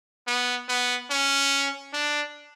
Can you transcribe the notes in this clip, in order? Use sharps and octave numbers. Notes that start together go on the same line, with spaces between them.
B3
B3
C#4
D4